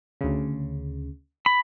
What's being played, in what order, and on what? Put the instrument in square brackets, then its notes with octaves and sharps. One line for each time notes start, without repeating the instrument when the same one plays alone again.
[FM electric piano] D2 C#3
[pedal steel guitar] B5